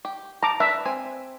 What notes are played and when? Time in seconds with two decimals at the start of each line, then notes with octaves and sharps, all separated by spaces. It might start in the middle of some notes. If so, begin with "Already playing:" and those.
0.05 G4
0.43 A5 A#5 D6
0.60 D4 A#4 B4 E5
0.85 C4 G#5